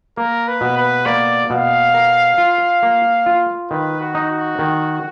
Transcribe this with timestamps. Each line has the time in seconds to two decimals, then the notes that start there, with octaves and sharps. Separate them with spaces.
0.17 A#3 A#4
0.47 B4
0.61 B2
0.77 B4
1.05 A#3 D5
1.50 B2 F5
1.94 A#4
2.38 F4
2.83 A#3
3.26 F4
3.70 D#3 B4
4.00 F#4
4.15 D#4
4.30 F#4
4.59 D#3